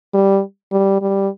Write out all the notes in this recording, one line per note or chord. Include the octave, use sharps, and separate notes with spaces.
G3
G3
G3